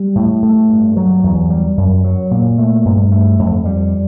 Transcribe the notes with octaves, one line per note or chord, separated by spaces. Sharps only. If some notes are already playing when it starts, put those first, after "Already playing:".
Already playing: G3
A2
A3
G2
F#3
E2
G3
F#2
F#3
A#2
A3
G2
A3
F2
G3